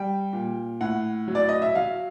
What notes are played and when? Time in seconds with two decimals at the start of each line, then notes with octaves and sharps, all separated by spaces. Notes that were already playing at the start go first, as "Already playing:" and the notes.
Already playing: G3 G5
0.33 A#2
0.81 A2 F#5
1.28 F#3
1.35 D5
1.49 D#5
1.62 E5
1.75 F#3 F5